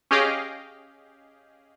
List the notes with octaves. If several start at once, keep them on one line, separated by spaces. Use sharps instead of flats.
C#4 G4 G#4 D#5 F5 G5